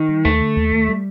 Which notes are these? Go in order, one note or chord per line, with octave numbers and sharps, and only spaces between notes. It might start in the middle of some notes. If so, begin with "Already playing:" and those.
Already playing: D#3
G3
D#2 A3
D3
D#2
D#2
G3